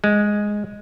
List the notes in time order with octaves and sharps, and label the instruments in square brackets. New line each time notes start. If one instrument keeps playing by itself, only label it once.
[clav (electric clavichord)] G#3